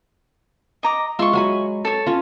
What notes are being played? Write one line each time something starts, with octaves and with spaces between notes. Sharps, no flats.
D#5 A#5 D6
G#3 F4 E5 C6 C#6
F#3 G#5 B5
A4 C#5 A5
C#4 F4